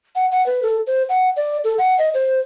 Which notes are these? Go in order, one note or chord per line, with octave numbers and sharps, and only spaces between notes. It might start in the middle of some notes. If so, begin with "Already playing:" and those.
F#5
F#5
B4
A4
C5
F#5
D5
A4
F#5
D#5
C5